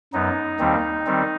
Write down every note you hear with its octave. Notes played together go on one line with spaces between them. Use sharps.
F#2 F#3 B3 D#4
D#2 D#3 G3 C4
D#3 G3 C4